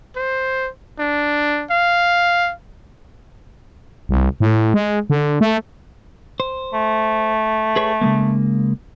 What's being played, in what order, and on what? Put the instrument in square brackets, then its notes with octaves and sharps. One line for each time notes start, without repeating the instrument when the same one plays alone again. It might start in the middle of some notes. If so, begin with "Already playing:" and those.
[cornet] C5
D4
F5
[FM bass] C2
A2
G#3
D3
A3
[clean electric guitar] C5
[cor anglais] A3
[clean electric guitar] G#4 B4 C#5
C#3 G#3 A#3